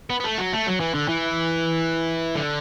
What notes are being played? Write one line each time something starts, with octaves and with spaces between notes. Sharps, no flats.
B3
B3
A3
F#3
A3
F#3
E3
D3
E3
D3